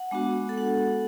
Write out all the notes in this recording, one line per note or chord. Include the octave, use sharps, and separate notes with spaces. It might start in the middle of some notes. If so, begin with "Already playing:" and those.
Already playing: F#5
G#3 B3 D4 F#4
A4
F#5